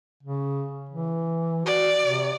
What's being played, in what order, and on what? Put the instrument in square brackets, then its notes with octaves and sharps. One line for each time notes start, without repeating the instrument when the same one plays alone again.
[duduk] C#3
E3
[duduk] F#4 [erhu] D5
[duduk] C3